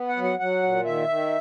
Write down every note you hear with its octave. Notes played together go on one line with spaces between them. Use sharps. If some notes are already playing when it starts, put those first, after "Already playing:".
Already playing: B3
F#5
F#3
F#5
F#3 F#5
A#2
D#3 E5
D#3